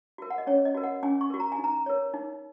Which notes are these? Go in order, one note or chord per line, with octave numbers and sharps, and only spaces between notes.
F#4 A#4
F#5
D#5
C#4 C#5
D#5
F#4 A#4
F#5
C#4 G#5
C#6
F#4 A#4
A#5
G#5
D#4
A#5
A#4 C#5
D#4